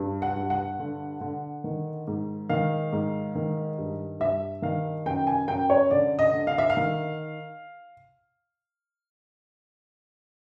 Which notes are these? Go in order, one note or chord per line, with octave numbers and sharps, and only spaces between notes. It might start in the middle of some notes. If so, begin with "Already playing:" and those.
Already playing: G2
F#5
G2
F#5
D3
D3
D#3
G#2
D#3 F5
G#2
D#3
G2
G2 E5
D#3 F5
F#2 G5
G#5
F#2 G5
C#5
D3 D5
D#5
D3
F5
E5
F5
D#3